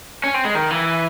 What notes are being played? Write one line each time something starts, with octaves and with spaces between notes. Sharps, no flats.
C#4
C4
G#3
D#3
E3